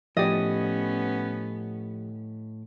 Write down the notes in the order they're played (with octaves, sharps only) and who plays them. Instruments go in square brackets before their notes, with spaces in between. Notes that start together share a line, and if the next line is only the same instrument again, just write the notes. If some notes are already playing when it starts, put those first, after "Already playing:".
[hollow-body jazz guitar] A2 D5 [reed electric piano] F3 G4 [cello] B3 C#4 [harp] D#5